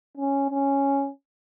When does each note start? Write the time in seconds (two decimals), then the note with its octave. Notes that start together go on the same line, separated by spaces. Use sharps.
0.17 C#4
0.50 C#4